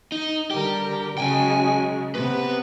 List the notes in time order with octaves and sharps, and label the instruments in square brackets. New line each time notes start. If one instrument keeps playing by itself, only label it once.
[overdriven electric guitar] D#4
[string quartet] D3 G3 A#4 [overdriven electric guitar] G4
[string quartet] C#3 F#3 G#3 [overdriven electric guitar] G5 G#5
[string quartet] C3 B3 [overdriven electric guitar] B4